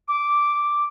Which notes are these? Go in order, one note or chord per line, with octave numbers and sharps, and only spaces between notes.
D6